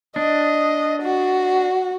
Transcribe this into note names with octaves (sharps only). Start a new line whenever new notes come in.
D4 D#5
F#4